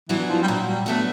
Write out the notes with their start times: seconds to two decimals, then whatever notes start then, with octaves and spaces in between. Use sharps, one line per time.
0.09 E3 F#3 B3 D4 F#4
0.28 F3
0.42 G3
0.47 A#2 F#3
0.67 G3
0.86 F#3 A3 B3 D4 F#4